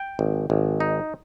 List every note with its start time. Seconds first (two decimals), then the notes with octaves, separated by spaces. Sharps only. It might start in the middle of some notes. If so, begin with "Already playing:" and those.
Already playing: G5
0.19 G#1
0.50 G#1
0.80 D#4